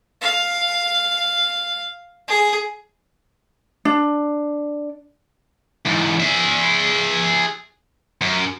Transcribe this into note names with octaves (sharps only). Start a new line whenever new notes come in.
F5
G#4
D4
E2 G#2
G#4 E5
F#2